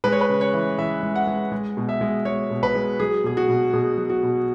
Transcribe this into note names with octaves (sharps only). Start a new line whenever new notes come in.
G#3 B4
C#5
B4
C#3
C#5
E3
E3 E5
G#3
F#5
G#3
G#3
B2
E5
G#3
G#3 C#5
B2
B4
G#3
F#3 G#4
B2 G#4
F#4
B2
B2 G#4
F#3
F#4
B2